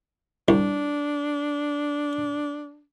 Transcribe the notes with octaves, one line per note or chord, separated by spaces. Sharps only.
C2 D4